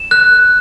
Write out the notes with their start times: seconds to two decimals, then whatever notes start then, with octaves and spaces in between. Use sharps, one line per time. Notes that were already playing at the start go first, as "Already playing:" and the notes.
Already playing: E7
0.11 F#6